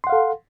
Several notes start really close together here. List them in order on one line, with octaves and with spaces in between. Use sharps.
C6 F#5 F5 A4